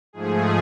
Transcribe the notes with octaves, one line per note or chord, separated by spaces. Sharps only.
G#2 F3 A3 G#4